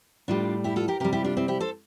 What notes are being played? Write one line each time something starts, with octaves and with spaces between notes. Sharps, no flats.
A2 G3 D4 F4
E4 G4
F4 A4
G4 A#4
C3 G3 G4 A#4
E4 G4
D4 F4
C4 E4
E4 G4
A4 C5